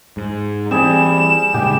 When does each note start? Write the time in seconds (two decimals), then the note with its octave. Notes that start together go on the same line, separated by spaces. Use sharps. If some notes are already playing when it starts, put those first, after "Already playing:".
0.17 G#2
0.71 E3 G3 C4 G#4 E7
1.54 A#2 C#3 G#3 G4 G5